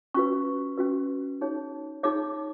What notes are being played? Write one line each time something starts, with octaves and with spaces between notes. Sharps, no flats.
C#4 F#4 B4 C#6
C#4 F#4 B4
D#4 G#4 C#5
D#4 G#4 C#5 D6